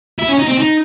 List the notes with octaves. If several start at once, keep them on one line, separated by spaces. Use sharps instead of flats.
E4
C#4
D#4
C4
D#4